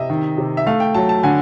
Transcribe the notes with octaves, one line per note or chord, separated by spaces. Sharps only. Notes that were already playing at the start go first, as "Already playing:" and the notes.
Already playing: C3 D#5 E5
D#3
C3
E5
A3 F5
G5
F#3 A5
A5
D3 G#5